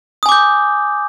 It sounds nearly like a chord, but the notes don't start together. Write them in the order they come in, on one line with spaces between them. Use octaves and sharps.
D#6 G#5 D6 G6